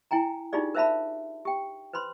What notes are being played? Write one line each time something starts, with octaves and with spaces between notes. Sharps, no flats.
E4 G5 G#5 A#5
D4 D#4 F4 G4 G#4 D5
A#4 C5 E5 F5 A5 B5
G4 G5
B4 C5 B5 C6